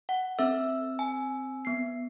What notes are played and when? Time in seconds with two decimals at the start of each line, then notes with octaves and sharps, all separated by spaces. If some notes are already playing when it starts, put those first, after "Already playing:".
0.09 F#5
0.39 C4 A4 E5 E6
0.99 G#5
1.65 B3 C7